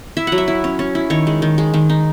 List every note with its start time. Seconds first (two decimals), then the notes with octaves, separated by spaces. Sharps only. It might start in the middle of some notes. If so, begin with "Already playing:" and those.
0.17 E4 E5
0.27 F#3 F#5
0.38 E5
0.48 E4
0.64 C#4
0.79 C#4
0.95 E4
1.10 D#3 C#5
1.27 G#3
1.42 D#3
1.58 G#3
1.74 D#3
1.89 D#4